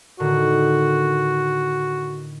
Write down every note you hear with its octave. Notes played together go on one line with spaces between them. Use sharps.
A2 D3 D#3 F#4